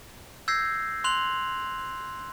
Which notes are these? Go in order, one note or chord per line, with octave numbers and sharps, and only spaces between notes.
E6 G6 G#6 A#6 C7
C6 F#6 F7 F#7